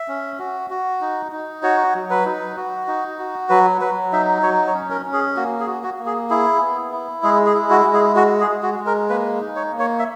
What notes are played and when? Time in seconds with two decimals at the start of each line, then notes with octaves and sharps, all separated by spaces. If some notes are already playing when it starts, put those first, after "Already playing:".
Already playing: E5
0.08 C#4
0.39 F#4
0.70 F#4
1.01 D#4
1.32 D#4
1.63 F#4 C#5
1.95 F#3
2.10 B4
2.25 D#4
2.57 F#4
2.87 D#4
3.19 F#4
3.49 F#3 B4
3.81 F#3 B4
4.12 D#4 E5
4.43 F#3 C#5
4.67 C#5
4.74 C#4
4.90 A#4
5.06 C#4
5.13 G#4
5.36 A#3 F#4
5.60 G#4
5.67 F#4
5.83 F#4
5.99 A#3
6.06 G#4
6.30 E4 G#4
6.61 B3
6.92 E4
7.23 G#3 G#4
7.46 G#4
7.54 E4
7.70 F#4
7.85 G#3
7.94 G#4
8.16 F#4
8.40 G#4
8.47 G#3
8.63 F#4
8.79 G#3
8.86 A#4
9.09 A#3 B4
9.41 D#4
9.56 C#5
9.72 A#3
9.79 C#5
9.99 E5